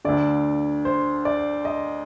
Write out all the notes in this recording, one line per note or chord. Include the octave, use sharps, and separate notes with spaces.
D2 D3 D5
C5
D5
D#5